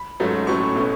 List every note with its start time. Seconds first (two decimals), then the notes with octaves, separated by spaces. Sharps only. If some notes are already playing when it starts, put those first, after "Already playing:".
Already playing: B5
0.20 G#2 F#3 A3 C#4
0.47 A2 F#3 A3 C#4 C#6
0.76 B2 A3 C#4